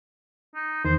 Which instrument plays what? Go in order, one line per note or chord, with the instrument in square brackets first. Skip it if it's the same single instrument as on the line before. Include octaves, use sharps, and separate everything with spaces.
[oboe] D#4
[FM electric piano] E2 D#3 [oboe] C5